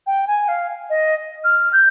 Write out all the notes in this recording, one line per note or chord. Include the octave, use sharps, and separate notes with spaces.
G5
G#5
F5
D#5
F6
G6